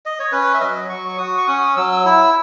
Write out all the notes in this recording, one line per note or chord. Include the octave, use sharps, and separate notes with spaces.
D#5
C#5
C#4 B4
E5
F#3 D#5
F#3 C#6
C#6
F#4 D#6
C#6
C#4 D#6
F#3 E6
E6
E4 E6
E6